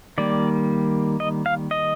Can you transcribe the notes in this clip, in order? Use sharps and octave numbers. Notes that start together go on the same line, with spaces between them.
D#3 G3 A#3 D5
D#5
F5
D#5